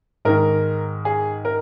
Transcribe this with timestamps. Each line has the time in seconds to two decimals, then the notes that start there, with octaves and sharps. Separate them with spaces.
0.25 G#2 D#3 A#4
1.05 G#4
1.45 A#4